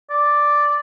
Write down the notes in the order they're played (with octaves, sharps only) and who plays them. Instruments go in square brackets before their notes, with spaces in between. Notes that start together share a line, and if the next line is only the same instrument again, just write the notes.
[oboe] D5